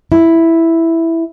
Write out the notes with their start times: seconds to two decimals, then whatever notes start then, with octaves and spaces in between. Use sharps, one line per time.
0.12 E4